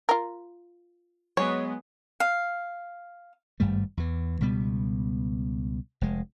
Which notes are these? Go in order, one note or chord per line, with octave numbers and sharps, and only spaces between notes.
F4 A#4
F#3 G#3 B3 C#5
F5
G#1 G2 G3 A3
E2 E3
C#2 B2 G3 B3
F1 G#3